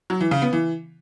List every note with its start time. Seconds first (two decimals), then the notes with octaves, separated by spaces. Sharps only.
0.10 F#3
0.21 E3
0.31 C#3
0.42 B3
0.53 E3